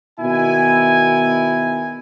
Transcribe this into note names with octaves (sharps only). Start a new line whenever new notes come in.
B2 D#3 E4 G#5